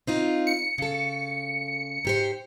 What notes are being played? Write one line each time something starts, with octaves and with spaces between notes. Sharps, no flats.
C4 D#4 F4
C#7
C#3 A4
G#2 G4 C5